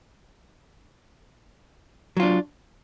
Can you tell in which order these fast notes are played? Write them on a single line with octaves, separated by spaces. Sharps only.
F#3 F4 D4